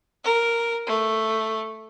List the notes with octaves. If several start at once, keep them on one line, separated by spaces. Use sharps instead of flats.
A#4
A3